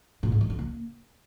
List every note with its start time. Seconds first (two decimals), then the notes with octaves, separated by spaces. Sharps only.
0.23 A#2
0.32 G#2
0.41 D#3
0.50 D3
0.59 A#3